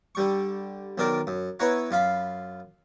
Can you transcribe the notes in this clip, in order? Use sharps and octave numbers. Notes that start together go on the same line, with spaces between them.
D3 G3 C#6
B1 D#3 D4 A#4 D5
F#2
B3 E4 B4 C#5 F#5 A#5
F#2 F4 F5 B5